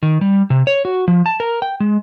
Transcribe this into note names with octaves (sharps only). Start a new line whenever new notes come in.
D#3
G3
C3
C#5
F#4
F3
A5
A#4
G5
G#3